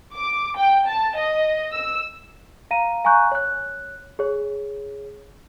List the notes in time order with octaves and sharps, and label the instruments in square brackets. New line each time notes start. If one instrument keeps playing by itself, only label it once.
[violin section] D6
G5
A5
D#5
E6
[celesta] F5 A#5 D#7
F5 G#5 A#5 C#6 F#6 G6
C#5 F#6
G#4 C#5